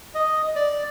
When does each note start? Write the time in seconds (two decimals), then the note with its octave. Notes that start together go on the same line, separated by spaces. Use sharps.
0.15 D#5
0.56 D5